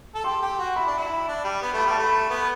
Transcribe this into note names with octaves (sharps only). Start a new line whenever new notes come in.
A4
G4 C6
G4
F#4
E4 B5
D4
E4
D4
G3
B3
A3 B5
G3 A5
A3
B5
B3